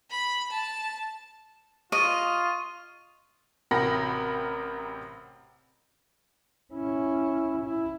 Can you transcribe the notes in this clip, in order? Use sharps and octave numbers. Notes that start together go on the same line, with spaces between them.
B5
A5
F4 D#5 C#6 D#7
A1 C3 F#4 A#4 B5 A#6
C#4 E4
E4